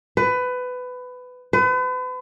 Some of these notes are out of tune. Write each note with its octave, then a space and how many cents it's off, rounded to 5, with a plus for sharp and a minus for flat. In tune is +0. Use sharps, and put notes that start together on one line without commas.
B4 +20
B4 +40